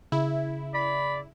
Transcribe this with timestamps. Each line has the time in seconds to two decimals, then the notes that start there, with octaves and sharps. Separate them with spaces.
0.12 C#3 E4
0.74 D5 B5